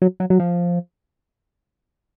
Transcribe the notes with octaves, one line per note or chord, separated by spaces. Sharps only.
F#3
F#3
F#3
F3